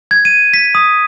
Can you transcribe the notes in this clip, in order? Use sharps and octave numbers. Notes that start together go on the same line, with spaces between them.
G#6
D#7
B6
D#6